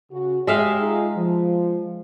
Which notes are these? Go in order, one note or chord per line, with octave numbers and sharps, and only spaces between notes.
C#3 F#4
G#3 G4 G#4 E5 F5
D#4 F4 G#4
F3